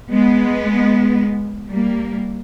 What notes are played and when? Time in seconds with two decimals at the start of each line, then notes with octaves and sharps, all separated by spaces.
0.11 G#3 B3
1.70 G3 A#3